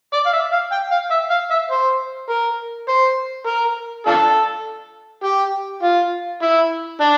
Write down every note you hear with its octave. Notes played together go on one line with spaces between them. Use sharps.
D5
F5
E5
F5
G5
F5
E5
F5
E5
C5
A#4
C5
A#4
D4 F4 A4
G4
F4
E4
D4